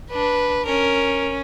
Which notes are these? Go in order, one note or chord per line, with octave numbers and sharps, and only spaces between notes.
D4 B4
C#4 A#4